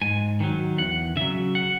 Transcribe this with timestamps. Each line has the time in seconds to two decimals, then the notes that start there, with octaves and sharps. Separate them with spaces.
0.01 G#2 G#5
0.40 D#3 F#3
0.78 E2 F#5
1.16 C#3 F#3 E5
1.55 F#5